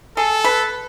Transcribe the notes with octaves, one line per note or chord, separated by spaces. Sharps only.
G#4 A4
B4